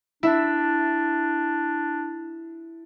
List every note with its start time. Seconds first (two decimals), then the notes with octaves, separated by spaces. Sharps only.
0.23 D4 E4 E5